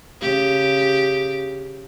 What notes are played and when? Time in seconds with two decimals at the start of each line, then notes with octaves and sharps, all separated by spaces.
0.21 C#3 G4